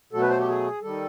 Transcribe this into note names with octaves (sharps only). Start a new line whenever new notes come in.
B2 F#3 A3 A4
B4
C5
G4
G#4
D#3 G3 A4